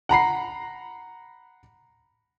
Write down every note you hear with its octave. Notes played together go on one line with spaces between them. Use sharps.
F#5 A#5 B5 C7